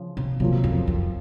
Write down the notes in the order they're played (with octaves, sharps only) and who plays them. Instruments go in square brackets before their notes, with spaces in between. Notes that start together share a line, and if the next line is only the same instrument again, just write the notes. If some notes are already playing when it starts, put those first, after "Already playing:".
Already playing: [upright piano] C#3 F3
[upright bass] C3
[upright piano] F#2 F3 A#3 [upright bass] C3
[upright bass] F2
F2